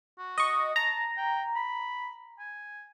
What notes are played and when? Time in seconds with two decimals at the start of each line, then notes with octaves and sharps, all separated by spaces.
0.19 F#4
0.38 D#5 C#6
0.76 A5 A#5
1.17 G5
1.56 B5
2.39 G#5